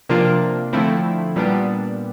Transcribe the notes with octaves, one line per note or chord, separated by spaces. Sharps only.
C3 F3 A#3 D4 F4
D3 F3 A3 C4 E4
A#2 G3 B3 D4